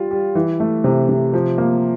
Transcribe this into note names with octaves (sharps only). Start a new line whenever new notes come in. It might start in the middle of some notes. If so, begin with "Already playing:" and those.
Already playing: G3 F4
G3
E3
A3
C3
C3
F3
A#3